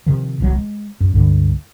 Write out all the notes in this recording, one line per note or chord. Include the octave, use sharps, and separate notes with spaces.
C3 D#3 F3
D1 C2 C3 F#3
G#3
F#2
C#2 G2 D3